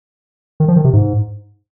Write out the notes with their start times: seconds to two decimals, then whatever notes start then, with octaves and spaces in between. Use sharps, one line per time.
0.60 D#3
0.68 F3
0.76 D#3
0.84 C3
0.93 G#2